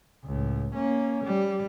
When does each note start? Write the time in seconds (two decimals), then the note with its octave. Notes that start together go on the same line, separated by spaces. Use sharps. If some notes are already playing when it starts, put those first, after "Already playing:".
0.25 C#2 A2
0.74 A#3 C#4
1.24 G3